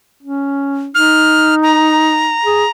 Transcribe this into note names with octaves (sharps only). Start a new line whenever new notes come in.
C#4
D#4 F6
A#5
G#4